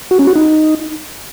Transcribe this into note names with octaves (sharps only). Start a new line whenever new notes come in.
F#4
C#4
F#4
D#4